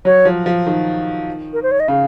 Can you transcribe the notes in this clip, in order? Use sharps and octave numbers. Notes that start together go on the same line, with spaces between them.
F#3 C#5
F3
F3
D#3
A#4
C5
C#5
D#5
C#3 F5